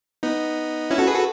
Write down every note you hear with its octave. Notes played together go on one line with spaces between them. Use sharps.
B3 D#4
C#4 E4
F#4 A4
G#4 B4
F#4 A4